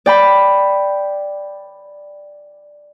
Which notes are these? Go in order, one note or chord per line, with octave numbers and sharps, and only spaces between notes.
D5 G5 B5